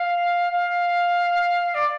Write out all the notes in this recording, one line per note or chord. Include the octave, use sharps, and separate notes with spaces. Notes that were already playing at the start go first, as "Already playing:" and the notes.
Already playing: F5
F5
D5